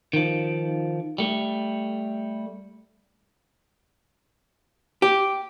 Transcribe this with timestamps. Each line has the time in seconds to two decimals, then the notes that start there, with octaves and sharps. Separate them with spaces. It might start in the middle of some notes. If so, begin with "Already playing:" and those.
0.13 D#3 F3
1.18 G3 A3
5.02 G4